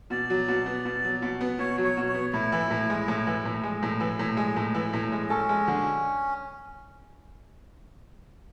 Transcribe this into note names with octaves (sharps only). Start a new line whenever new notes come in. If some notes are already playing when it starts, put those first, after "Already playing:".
B2 D5
F#3
B2
B3
B2
F#3
B2
B3
B2 C#5
F#3
C#5
B2
C#5
B3
A2 E4
E3
A2
G#3
A2
E3
A2
G#3
A2
E3
A2
G#3
A2
E3
A2
G#3
C#4 A4
G#3
D3